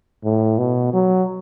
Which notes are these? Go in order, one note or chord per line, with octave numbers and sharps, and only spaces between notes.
A2
B2
F#3